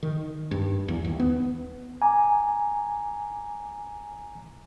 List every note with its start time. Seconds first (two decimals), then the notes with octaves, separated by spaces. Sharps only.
0.03 D#3
0.51 G2
0.88 E2
1.05 D#2
1.20 B3
2.02 G#5 A#5 D6